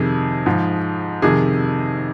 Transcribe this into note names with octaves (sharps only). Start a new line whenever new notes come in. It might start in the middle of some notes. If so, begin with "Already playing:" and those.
Already playing: F2 C3 D#3 G#4
G#2 F3
F2 C3 D#3 G#4